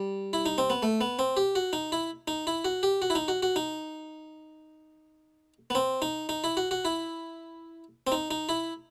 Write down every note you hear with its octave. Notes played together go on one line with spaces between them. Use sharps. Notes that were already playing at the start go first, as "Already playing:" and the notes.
Already playing: G3
E4
D#4
C4
B3
A3
B3
C4
G4
F#4
D#4
E4
D#4
E4
F#4
G4
F#4
E4
D#4
F#4
F#4
D#4
B3
C4
D#4
D#4
E4
F#4
F#4
E4
C4
D#4
D#4
E4